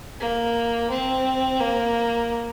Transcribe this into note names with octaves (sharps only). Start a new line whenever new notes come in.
A#3
C4
A#3